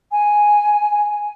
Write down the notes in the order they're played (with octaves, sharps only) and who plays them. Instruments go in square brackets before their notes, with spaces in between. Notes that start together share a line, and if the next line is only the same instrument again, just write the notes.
[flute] G#5